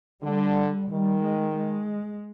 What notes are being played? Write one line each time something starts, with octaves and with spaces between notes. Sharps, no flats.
D3 G3
D#3 G3
G#3
G#3